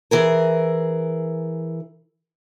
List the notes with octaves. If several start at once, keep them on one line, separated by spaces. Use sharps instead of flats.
E3 G#4 A#4